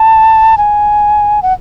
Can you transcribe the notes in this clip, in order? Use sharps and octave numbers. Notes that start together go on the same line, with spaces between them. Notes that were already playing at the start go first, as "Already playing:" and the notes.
Already playing: A5
G#5
F#5